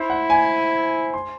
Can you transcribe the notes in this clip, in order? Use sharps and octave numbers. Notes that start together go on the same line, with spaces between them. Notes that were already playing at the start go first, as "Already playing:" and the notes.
Already playing: E4 C5
F#5
G#5
C6